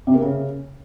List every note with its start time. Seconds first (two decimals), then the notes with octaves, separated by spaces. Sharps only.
0.07 C3
0.14 A#3
0.21 C#3